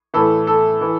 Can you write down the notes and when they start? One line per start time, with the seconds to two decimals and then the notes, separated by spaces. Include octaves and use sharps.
0.14 A2 E3 A4
0.47 A4
0.81 E3